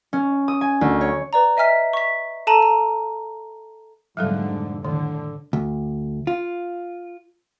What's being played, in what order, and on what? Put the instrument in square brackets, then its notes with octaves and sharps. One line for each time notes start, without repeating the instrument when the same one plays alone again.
[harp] C#4
D#6
G#5
D2
C#5
[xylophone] B4 D5 A#5
D#5 E5 G#5 F6 B6
C#6 B6
A4 A5 A#5 D#7 F#7
A#5
[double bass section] F1 G#2 D3 [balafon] F#3 G3 A4
[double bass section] A2 D3 [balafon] D#3
[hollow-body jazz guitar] D2
F4